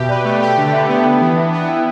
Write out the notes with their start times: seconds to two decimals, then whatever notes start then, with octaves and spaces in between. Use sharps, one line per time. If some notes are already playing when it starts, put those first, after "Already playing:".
Already playing: B2 G4 E5
0.09 B4 D5
0.25 A3
0.41 G4 G5
0.57 D3
0.68 G5
0.73 B4 E5
0.88 B3
1.04 D4 G5
1.21 E3
1.36 E3 E5
1.52 B3
1.67 E4 G5